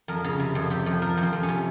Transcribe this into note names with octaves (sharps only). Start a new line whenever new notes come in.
F2 A#4
C#3
C3
F2
C3 G4
F2
F3 A#4
F2
C4
F2
C#4
C3